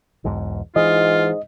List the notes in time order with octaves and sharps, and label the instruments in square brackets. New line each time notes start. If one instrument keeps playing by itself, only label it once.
[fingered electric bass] B1 E2 G#2
[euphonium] G#2 [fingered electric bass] E3 [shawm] F4 [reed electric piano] D#5